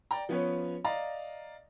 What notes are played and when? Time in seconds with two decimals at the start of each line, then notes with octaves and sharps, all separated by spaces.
0.11 D5 G5 A#5
0.29 F3 B3 C#4 B4 C#5
0.84 D5 D#5 F5 A#5